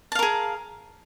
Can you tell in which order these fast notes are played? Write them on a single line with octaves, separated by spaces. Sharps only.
A5 F5 A#4 G#4